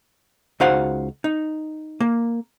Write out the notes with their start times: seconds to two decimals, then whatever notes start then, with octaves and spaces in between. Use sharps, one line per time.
0.60 C#2 D#4 F#4 C5 F5 F#5
1.24 D#4
2.00 A#3